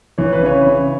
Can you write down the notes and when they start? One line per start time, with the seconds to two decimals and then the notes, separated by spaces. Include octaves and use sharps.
0.18 E3 C#5
0.32 B4
0.42 C#3 C#5
0.67 C#3